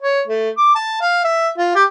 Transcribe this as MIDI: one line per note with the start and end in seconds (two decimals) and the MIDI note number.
0.02 0.21 73
0.28 0.50 57
0.57 0.71 86
0.75 0.99 81
1.00 1.23 77
1.24 1.49 76
1.58 1.70 65
1.75 1.83 67